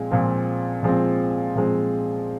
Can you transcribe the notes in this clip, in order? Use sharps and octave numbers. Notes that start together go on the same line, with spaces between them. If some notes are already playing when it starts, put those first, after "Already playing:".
Already playing: A#2 F3 G#3 C4
A#2 F3 G#3 C4
A#2 F3 G#3 C4
A#2 F3 G#3 C4